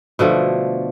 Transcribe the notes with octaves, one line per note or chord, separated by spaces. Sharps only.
B2 D3 F3 A3